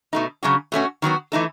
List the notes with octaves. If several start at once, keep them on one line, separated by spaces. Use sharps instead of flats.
B2 A3 D#4
C#3 F#3 C#4 F#4
B2 A3 C#4 F#4
D#3 F#3 B3 F#4
E3 A3 D#4 A4